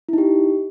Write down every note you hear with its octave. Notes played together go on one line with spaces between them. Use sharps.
D#4 E4 G4